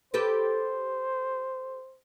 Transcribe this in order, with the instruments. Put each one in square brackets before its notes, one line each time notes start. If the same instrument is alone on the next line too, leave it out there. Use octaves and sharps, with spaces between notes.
[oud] G4 A4 B4 [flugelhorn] C5